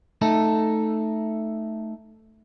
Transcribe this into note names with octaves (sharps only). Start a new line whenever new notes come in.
A3 D#4 A4